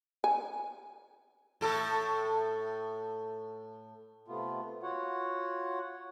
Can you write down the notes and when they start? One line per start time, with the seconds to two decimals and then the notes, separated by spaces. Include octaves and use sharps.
0.24 G#5
1.61 A2 A4
4.28 C3 A3 B3 F4
4.83 F4 F#4 C#5 F#5